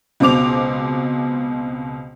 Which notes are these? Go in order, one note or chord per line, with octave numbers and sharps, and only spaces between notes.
C#2 B2 C4 D6 F7